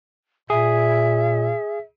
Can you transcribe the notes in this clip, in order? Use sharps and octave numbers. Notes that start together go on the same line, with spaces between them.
A#2 G#4 E5